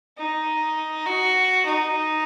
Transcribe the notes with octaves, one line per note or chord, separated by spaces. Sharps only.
D#4
F#4
D#4